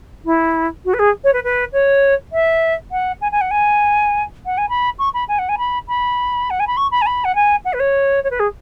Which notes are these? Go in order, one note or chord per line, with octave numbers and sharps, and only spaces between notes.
E4
F#4
B4
G#4
C#5
B4
B4
C#5
E5
F#5
G#5
G#5
F#5
G#5
F#5
G#5
B5
C#6
B5
G#5
F#5
G#5
B5
B5
F#5
G#5
B5
C#6
B5
G#5
B5
F#5
G#5
F#5
B4
C#5
C#5
B4
G#4